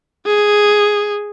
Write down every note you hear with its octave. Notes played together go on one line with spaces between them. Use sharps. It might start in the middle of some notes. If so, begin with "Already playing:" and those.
G#4